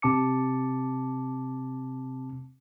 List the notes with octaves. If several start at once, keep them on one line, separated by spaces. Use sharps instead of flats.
C3 C4 A5 D6 C#7